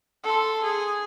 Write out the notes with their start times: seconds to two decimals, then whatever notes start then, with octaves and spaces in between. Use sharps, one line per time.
0.23 A4 C6
0.64 G#4